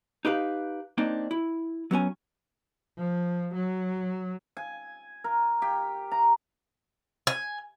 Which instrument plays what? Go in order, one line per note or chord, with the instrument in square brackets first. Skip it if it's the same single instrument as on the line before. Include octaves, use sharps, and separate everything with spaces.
[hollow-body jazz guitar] D#4 G4 B4 F5
A#3 C4 D4 D#4
E4
F#3 B3 C#4 G#5
[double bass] F3
F#3
[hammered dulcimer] G#5
A#4
G4
A#5
[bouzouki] G#5